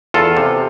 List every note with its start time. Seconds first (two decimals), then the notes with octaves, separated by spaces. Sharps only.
0.14 E2 F4 A4
0.37 C3